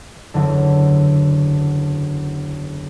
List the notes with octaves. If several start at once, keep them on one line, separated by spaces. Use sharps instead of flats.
F#1 E2 D3